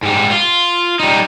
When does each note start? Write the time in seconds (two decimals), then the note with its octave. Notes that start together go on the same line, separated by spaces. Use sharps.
0.03 G#2 G3
0.31 F4
1.00 G3 D#4